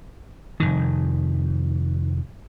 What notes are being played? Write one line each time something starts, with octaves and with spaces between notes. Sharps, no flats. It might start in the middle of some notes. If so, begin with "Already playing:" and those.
F1 B1 D#3